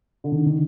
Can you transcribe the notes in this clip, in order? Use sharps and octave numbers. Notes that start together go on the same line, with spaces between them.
D3
D#3
D#3